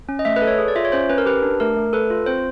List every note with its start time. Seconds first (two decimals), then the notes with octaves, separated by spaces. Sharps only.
0.09 C#4
0.19 D#5
0.25 A3 E5
0.36 B4
0.42 A4
0.47 C#5
0.59 G#4
0.68 D5
0.76 F4 E5
0.85 C#5
0.92 C#4 C5
1.09 C#4 B4
1.18 A#4
1.26 G4 B4
1.42 D4
1.60 A3 A#4
1.76 A3
1.93 A4 B4
2.10 F4
2.26 C4 C5